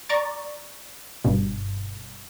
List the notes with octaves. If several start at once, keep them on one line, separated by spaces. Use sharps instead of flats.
D5 A#5 C#6 D6 A6
G1 G2 B2